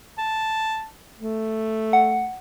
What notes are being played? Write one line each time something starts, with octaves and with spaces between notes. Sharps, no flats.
A5
A3
F#5